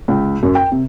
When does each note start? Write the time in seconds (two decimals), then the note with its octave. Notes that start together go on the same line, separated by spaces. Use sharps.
0.08 C#2
0.43 F#2
0.55 G5
0.72 C3